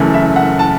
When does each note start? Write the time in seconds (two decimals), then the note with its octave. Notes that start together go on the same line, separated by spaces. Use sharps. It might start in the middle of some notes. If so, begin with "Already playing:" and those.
Already playing: F#1 F#2 E3 A3
0.14 E5
0.36 F#5
0.59 A5